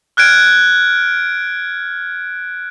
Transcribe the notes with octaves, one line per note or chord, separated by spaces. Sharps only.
F6 F#6 G#6 D7